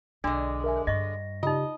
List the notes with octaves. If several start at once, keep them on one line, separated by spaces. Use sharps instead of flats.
B1 D3 G#3 D4
A#4 E5 G#5
G2 D#5 C#6 A#6
C#3 D#4 F4 G4 D#5